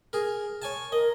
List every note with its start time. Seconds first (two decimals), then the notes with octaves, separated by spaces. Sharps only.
0.13 G#4 A#4
0.62 C#5 G#5 A5
0.92 A#4 D#5